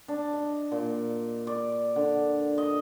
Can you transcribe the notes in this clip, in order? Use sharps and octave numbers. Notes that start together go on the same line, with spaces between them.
D4
D#5
A#2
D5
D3
D#5